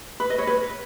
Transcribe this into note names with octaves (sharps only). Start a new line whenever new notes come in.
B4
D#5
C#5
B4